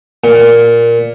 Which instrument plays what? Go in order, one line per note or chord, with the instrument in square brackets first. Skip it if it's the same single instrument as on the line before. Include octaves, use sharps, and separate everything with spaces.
[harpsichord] A#2